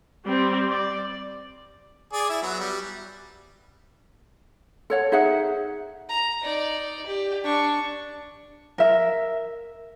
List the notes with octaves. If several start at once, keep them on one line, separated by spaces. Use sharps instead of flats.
G3 C4
D5
G#4 D5
E4 E5
F#3 B3
G3
A4 C#5 F#5
D#4 G#4 E5 F#5
A#5
D#4 D5
G4
D4 C#6
A#4 E5